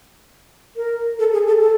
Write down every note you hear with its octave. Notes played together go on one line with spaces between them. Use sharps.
A#4
A4
G#4
A4
A4